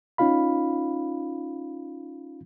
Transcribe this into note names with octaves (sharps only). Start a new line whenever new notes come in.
C#4 D#4 F4 F5 B5